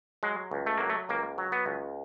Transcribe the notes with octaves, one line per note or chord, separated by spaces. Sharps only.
F#3 G#3
C#2
A3
F#3 A#3
A3
C#2 A#3
F#3
B3
C#2